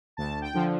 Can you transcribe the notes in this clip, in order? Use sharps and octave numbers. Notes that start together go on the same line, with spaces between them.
D2 A5
G5
D3 F3